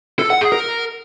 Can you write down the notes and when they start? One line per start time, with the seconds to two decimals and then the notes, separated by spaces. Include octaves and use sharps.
0.19 A4
0.30 F#5
0.41 G#4
0.52 A#4